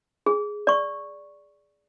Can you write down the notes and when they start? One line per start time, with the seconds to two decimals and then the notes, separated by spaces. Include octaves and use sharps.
0.26 G#4
0.67 D5 C#6